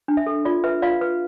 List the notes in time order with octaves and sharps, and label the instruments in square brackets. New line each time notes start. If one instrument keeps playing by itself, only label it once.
[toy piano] D4
E5
A4
F4 D5
B4 E5
F4 D5 F5
B4